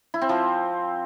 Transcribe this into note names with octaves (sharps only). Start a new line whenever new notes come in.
E4
C4
F3